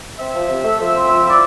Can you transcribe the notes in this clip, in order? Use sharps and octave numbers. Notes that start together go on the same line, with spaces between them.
C4 E5
F3
C3
A3
F3
C4
F3
E4 D5